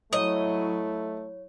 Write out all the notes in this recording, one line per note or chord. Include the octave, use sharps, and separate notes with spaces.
F#3 A3 E4 C#5 D#5